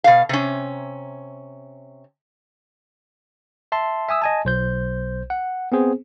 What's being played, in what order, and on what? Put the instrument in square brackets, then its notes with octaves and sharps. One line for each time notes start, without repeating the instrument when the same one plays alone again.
[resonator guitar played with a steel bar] B2 F5
C3 C#4
[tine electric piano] E5 A5 C6
E5 G#5 D#6 E6
D#5 G#5 A5
B1 C5 G6
F#5
B3 C4 G#4 C5